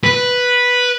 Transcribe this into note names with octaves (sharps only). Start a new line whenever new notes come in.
B4